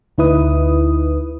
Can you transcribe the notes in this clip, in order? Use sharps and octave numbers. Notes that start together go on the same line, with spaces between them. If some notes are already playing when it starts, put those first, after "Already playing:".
D2 D#4 E4 B4 D#6